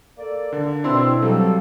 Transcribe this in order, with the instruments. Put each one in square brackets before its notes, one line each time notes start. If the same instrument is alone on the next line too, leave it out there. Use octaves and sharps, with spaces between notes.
[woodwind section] A#3 A4 D5
[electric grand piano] D3 [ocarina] A#4
[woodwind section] B2 [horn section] C4 [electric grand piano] D4 E4 C6 [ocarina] E6
[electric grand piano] F#3 G3 C4 [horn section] A4 [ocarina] F5